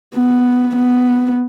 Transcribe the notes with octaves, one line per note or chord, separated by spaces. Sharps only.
B3
B3